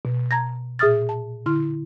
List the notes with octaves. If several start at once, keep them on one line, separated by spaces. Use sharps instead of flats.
B2
A5 A#5 G#6 A#6
A#2 G#4 E5 D#6 F6 A6
A5
D3 E4 C6 F6